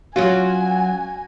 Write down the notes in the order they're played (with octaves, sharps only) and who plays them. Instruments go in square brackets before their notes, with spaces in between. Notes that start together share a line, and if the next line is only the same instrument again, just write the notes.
[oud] F#3 C#4 F4 [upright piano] F#4 [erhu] G#5